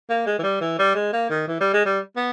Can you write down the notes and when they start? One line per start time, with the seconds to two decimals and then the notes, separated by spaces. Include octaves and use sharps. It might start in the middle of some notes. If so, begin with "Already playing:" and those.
0.09 A#3
0.26 G#3
0.39 E3
0.43 G3
0.61 E3
0.79 G3
0.95 G#3
1.13 A#3
1.30 D#3
1.48 E3
1.60 G3
1.73 G#3
1.85 G3
2.16 B3